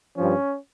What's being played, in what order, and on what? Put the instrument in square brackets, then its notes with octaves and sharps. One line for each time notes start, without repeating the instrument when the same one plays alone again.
[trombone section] G2 F3 C#4